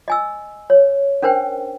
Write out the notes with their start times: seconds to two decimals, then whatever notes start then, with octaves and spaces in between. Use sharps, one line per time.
0.08 D#5 G#5 E6
0.70 C#5
1.22 C#4 D4 A#4 C5 G5